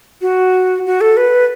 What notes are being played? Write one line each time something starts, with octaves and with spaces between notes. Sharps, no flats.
F#4
F#4
A4
B4